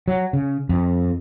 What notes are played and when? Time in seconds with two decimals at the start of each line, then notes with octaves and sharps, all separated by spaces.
0.08 F#3
0.33 C#3
0.69 F2